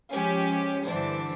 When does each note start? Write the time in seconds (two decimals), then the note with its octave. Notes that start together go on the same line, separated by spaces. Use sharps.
0.11 F3 G#3 C#4 G4
0.87 G2 D3 E3 D4 C5